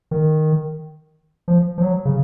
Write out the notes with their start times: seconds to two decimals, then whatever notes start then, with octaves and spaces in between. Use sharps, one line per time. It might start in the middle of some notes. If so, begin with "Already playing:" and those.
0.11 D#3
1.48 F3
1.78 F3
1.82 F#3
2.05 C#3